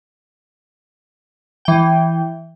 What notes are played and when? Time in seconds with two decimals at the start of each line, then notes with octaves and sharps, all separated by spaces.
1.65 E3 G5